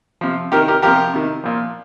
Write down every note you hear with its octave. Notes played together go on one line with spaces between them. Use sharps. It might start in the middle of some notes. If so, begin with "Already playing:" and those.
C3 F3
C3 D#3 G4 A#4
G4 A#4
C3 F3 G4 A#4
C3 D#3
A#2 F3